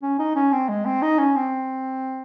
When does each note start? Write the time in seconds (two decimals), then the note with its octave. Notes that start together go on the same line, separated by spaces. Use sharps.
0.03 C#4
0.19 D#4
0.36 C#4
0.52 C4
0.69 G#3
0.86 C4
1.02 D#4
1.18 C#4
1.36 C4